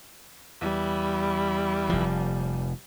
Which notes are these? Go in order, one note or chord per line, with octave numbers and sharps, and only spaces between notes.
E2 G3 E4 B4
F1 F3